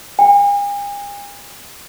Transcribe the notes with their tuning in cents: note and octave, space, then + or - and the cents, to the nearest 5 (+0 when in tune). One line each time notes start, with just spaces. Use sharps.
G#5 -45